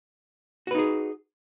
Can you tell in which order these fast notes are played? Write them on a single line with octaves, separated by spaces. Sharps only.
F#4 B4 D#4 G#4